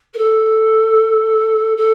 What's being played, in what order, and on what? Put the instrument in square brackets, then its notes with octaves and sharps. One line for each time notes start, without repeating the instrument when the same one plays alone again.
[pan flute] A#4
A4
A4